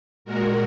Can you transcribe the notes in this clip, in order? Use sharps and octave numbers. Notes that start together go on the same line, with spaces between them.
A#2 G#3 F#4 A#4